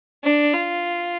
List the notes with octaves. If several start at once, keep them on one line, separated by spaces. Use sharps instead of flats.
D4
F4